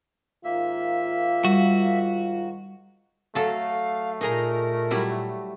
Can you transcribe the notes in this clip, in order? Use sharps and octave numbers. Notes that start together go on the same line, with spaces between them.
G#2 D#3 A#3 F4 E5
G3 F#4
F#3 A3 A4 F5
A#2 D#4 G#4 A#4 A#5
F#3 G3 E4